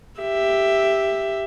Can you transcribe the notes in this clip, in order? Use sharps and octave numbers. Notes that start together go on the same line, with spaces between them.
G4 E5